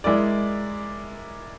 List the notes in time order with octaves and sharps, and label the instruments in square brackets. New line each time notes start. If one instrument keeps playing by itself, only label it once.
[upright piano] G#3 E4 A#4 D5